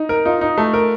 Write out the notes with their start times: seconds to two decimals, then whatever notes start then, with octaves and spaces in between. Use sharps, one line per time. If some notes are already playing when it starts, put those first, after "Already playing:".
Already playing: D#4
0.09 A#4
0.25 D#4 F4
0.41 D#4
0.58 A3
0.74 A#4